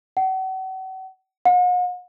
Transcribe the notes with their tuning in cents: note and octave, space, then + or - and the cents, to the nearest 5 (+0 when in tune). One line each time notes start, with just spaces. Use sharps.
F#5 +40
F#5 -45